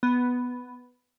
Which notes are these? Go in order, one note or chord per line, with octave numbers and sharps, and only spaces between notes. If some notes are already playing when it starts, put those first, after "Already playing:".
B3